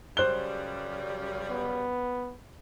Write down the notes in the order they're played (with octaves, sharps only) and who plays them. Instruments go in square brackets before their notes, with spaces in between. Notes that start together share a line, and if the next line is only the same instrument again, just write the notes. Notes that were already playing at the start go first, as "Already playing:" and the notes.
[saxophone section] F#2 C#3 G3 [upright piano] C5 F#6 G7
[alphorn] B3